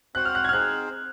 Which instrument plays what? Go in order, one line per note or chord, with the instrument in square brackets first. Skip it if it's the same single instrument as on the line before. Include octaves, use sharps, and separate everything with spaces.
[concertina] C4 F#4 C5 F#5 [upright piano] F#6
[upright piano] F6
F#6
G#6
F6
[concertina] C4 D#4 G#4 C5 [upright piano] F#6